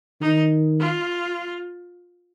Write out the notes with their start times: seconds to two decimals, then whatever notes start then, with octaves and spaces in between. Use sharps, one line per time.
0.21 D#3 D#4
0.80 F4